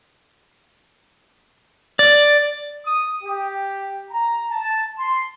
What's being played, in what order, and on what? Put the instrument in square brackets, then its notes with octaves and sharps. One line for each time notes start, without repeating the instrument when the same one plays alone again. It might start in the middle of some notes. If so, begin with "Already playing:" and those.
[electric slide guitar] D5
[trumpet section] D#6
G4
A#5
A5
C6